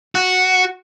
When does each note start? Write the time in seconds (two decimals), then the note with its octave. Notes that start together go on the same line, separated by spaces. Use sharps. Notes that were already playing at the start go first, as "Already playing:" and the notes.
0.15 F#4